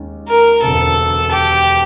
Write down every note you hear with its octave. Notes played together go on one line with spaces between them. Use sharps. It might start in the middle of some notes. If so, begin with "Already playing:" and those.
Already playing: D#2 D#3 G#3 C#4
A#4
E1 D2 C3 A4
G4